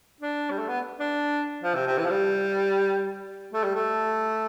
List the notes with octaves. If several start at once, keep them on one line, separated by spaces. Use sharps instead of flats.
D4
G3
A3
B3
D4
F3
C3
C3
E3
F3
G3
A3
G3
A3